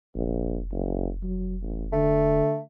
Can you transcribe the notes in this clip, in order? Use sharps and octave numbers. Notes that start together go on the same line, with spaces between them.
F1 A#1
F#1
F#3
A1
D3 A3